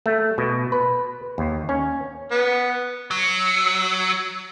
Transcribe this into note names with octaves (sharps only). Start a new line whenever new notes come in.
A3
B2
B4
D#2
C#4
B3
F#3